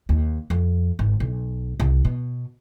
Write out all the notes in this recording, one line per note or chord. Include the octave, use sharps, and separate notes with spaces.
D#2
F2
G#1
B1
C2
B2